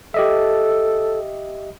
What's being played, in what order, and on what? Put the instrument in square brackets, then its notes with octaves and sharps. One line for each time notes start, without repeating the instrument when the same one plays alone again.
[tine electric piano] G4 D#5 E5 [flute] A4